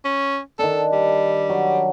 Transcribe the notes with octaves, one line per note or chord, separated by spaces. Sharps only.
C#4
D#3 D4 A4
G3
F#3